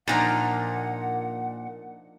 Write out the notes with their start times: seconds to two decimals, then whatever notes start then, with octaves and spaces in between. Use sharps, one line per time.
0.08 A#2 F3 D4 D#4 F#5 A#5